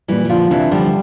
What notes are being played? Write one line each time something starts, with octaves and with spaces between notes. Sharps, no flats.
A#2 E3 G3
G3
D3 F3 F4
C3 E3 D4
D3 F3 G3